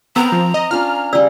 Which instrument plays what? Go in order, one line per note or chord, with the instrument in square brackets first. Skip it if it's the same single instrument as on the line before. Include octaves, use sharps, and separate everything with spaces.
[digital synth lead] B3 [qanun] C4 A#4 [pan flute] A#5 [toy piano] E6
[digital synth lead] F3
D#5
[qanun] C#4 D4 F4 [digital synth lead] F6
[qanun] C#3 G3 [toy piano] D5 E6